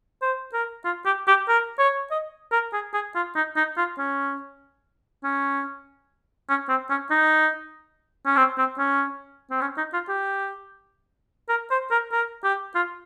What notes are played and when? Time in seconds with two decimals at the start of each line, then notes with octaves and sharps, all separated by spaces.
0.22 C5
0.53 A#4
0.85 F4
1.06 G4
1.27 G4
1.48 A#4
1.79 C#5
2.11 D#5
2.52 A#4
2.73 G#4
2.93 G#4
3.15 F4
3.36 D#4
3.56 D#4
3.77 F4
3.98 C#4
5.24 C#4
6.49 C#4
6.69 C4
6.90 C#4
7.11 D#4
8.26 C#4
8.37 C4
8.58 C4
8.79 C#4
9.51 C4
9.61 C#4
9.77 D#4
9.93 F4
10.08 G4
11.49 A#4
11.71 C5
11.91 A#4
12.12 A#4
12.44 G4
12.75 F4